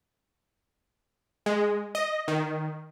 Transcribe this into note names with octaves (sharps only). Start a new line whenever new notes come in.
G#3
D#5
D#3